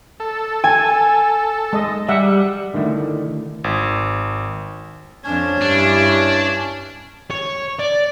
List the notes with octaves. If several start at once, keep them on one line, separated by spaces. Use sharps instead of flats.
A4
G#5
G#3 D#5
G3 E5 F#5
D3 D#3 A3 E4
G#1
F2 C#4 D4 C#5
G2 D4 E4
C#5
D5